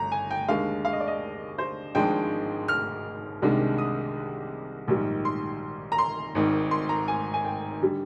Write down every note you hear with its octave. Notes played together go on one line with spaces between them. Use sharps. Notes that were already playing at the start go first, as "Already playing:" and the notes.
Already playing: G1 A#5
G#5
G5
D#2 D3 G#3 F5
F5
D#5
D5
D#5
C5
G#1 G#2 F3 G#3 D4 G5
F6
C2 C3 D#3 G#3 D4
D#6
A#1 G#2 D#3 G3
C6
A#5
C6
G#1 G#2 D#3
C6
A#5
G#5
G#5
G5
D3 G3